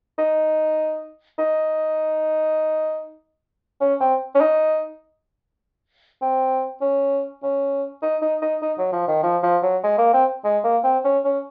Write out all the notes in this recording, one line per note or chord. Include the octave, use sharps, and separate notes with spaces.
D#4
D#4
C#4
C4
C#4
D#4
C4
C#4
C#4
D#4
D#4
D#4
D#4
F#3
F3
D#3
F3
F3
F#3
G#3
A#3
C4
G#3
A#3
C4
C#4
C#4